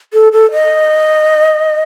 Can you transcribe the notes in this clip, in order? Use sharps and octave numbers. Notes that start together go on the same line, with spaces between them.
A4
A4
D#5